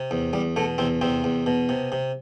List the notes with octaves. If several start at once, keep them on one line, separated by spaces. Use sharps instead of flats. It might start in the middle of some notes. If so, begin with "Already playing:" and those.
Already playing: C3
E2
E2 G3
B2 A3
E2 C3 C4
E2 C3 C4
E2
B2
C3
C3